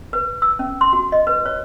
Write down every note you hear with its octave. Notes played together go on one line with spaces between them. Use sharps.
B4
E6
C#4
C6
F#4
D#5
B4
C#5